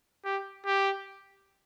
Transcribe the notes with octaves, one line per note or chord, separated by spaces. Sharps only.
G4
G4